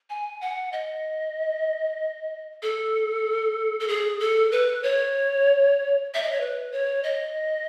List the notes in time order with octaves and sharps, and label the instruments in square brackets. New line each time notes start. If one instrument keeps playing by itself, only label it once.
[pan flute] G#5
F#5
D#5
A4
A4
G#4
A4
B4
C#5
E5
D#5
C#5
B4
C#5
D#5